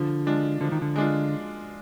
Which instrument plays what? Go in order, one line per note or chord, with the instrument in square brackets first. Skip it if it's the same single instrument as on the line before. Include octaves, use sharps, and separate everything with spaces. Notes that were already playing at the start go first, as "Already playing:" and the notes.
Already playing: [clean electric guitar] D3 [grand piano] F3
[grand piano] G#3 D4 F4
[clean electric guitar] D3 [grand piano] F3
[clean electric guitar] D#3
D3
[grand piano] G#3 D4 F4